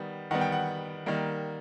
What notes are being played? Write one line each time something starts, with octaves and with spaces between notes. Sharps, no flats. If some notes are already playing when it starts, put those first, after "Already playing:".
Already playing: D#3 G3 B3
D#3 G3 B3 F#5
G5
F#5
D#3 G3 A#3